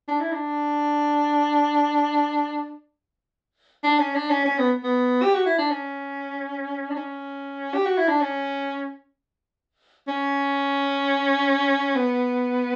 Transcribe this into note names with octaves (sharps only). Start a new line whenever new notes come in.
D4
E4
D4
D4
C#4
D4
C#4
C#4
B3
B3
G4
F#4
E4
D4
C#4
D4
C#4
G4
F#4
E4
D4
C#4
C#4
B3